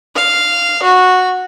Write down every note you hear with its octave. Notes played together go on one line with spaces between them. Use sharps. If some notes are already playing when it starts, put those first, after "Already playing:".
F5
F#4